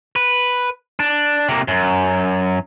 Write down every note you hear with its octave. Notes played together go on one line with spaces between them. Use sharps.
B4
D4
C3 A#3
F#2